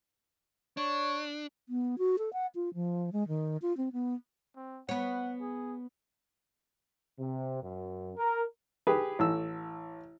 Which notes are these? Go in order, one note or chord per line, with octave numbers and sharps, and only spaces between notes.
D4 C#5
B3
F#4
A4
F#5
F4
F3
G#3
D#3
F4
C4
B3
C4
B3 C#5 F#5
G#4
C3
F#2
A#4
G4 G#4 B4
A1 E6